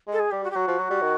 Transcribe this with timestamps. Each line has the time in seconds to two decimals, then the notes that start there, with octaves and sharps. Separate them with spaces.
0.07 G#3
0.13 A4
0.19 G#4
0.31 G3 G4
0.44 F#4
0.50 G4
0.55 F#3 F#4
0.67 F3
0.79 F#3
0.90 G3
1.02 D#3